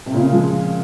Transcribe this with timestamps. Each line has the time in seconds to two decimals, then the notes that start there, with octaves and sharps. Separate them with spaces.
0.06 C3
0.13 A#2 C#3
0.32 F3 G#3